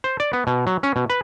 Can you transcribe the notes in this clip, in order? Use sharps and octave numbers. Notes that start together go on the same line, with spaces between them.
C5
D5
B3
B2
F#3
C#4
B2
B4